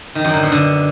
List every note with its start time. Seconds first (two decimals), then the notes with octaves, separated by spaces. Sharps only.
0.15 D#3
0.24 F#2
0.34 D3
0.43 B2
0.52 D3